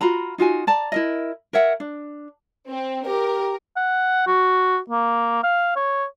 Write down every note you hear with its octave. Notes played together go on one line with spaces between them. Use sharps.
F4 F#4 A#5 B5
D#4 F4 F#4 G#5
D5 A5 A#5
E4 A#4 D#5
A#4 C#5 E5 F#5
D4
C4
G4 A#4
F#5
F#4
A#3
F5
C#5